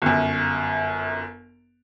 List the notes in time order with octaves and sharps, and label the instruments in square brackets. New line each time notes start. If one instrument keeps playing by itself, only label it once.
[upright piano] G1 F#2